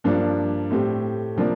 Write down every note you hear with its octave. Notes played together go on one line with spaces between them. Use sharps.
G2 F3 A#3 D4
A2 A3 C4 G4
C3 F3 A#3 D4